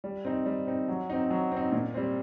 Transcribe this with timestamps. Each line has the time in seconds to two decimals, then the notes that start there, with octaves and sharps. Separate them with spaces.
0.04 G3
0.25 C4 D#4
0.46 G3
0.67 C4 D#4
0.88 F#3
1.10 C4 D#4
1.30 F#3
1.52 C4 D#4
1.72 A#2
1.94 G3 C4